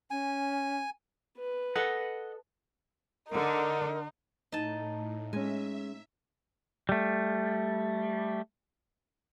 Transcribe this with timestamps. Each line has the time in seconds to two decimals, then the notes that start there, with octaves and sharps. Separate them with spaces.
0.11 C#4 G#5
1.38 B4
1.76 A4 D#5 F#5
3.31 D3 D#4 A#4
4.52 A2 D#4 A5
5.33 G#3 C#4 E5 G#5
6.89 G3 A3